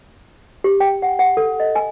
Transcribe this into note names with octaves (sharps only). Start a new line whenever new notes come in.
G4
G5
F#5
F#5
A4
D#5
G#5